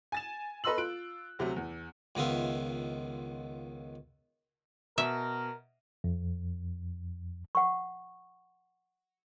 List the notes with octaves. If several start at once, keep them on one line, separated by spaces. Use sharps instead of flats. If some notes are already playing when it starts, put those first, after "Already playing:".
G#5 A6 E7
A4 B4 D#5 C6 E6 F#7
F4 F#6 D7
D2 C3 F#3 A3
E2
C#2 D#3 B3 F4 E5
B2 A#4 E5
F2
F#5 C#6